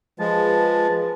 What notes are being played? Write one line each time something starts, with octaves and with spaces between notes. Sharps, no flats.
F3 G#3 F4 G#4 B4 A5